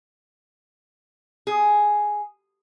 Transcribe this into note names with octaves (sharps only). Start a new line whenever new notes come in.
G#4